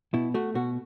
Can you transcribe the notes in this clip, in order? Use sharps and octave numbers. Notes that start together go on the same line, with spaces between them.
B2 E4
A3 F#4
B2 F#4